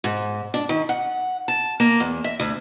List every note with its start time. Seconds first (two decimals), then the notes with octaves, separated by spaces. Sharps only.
0.04 G#2
0.54 D4
0.69 D#3
0.89 F#5
1.48 A5
1.80 A#3
2.00 E2
2.24 E5
2.40 D2